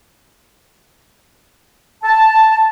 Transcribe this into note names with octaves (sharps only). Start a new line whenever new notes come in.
A5